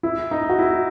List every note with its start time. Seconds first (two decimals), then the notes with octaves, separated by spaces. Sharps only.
0.03 E4
0.31 D#4
0.49 F#4
0.59 E4